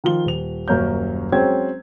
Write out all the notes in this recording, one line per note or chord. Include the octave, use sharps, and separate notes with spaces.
D#3 F3 F4 G7
D#1 F7
D#1 F#2 A#3 C#4 G6
F#3 G#3 C4 C#4 G5 G#6